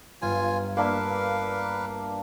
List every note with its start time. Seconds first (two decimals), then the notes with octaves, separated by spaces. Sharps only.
0.22 G1 G2 F4 G#5
0.77 A#3 D4 A#4 B4 E5 F5